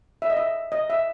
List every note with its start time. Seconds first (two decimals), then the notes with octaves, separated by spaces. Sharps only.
0.22 E5
0.30 D#5
0.37 E5
0.72 D#5
0.90 E5